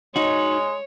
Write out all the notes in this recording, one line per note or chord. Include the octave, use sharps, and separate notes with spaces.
G#3 D#4 F#4 C#5